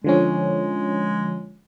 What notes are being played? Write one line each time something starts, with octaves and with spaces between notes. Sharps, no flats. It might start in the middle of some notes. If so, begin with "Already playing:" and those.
D3 F3 G#3 C#4